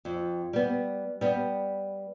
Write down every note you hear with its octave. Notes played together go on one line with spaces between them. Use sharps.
F2
G3 B3
G3 B3